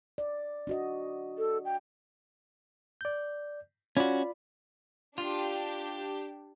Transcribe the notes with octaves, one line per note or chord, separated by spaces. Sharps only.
D5
D4 F#4 D#5
A4
G5
D5 G6
C#4 F4 F#4 D5 B5
D4 F4 G4